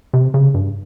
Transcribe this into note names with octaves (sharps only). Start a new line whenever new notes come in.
C3
C#3
G2